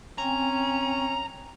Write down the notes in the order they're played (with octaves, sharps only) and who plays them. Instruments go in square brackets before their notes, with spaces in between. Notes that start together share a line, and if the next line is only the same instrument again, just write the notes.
[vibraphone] C4 G5 G#5 [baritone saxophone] C#4 [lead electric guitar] A#5